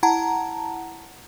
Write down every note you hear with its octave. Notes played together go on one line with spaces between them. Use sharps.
E4 F#5 A5 A#5